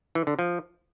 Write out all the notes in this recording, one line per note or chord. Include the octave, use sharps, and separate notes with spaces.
E3
D3
F3